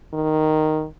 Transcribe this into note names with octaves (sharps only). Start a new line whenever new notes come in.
D#3